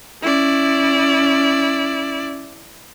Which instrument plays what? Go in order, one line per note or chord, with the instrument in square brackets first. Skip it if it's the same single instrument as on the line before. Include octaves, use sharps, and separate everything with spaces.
[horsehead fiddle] C#4 [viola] E4 D5